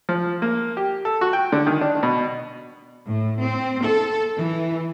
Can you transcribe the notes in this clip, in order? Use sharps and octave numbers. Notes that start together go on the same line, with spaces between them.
F3
A#3
G4
A4
F#4
G5
D3
D#3
D4
B2
A2
C4
A4
E3